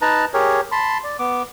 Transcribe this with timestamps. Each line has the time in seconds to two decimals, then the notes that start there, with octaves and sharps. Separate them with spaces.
0.02 D#4 B4 A5 A#5
0.34 G4 G#4 A#4 C#5
0.72 A5 B5 C6
1.04 D5
1.19 B3 D6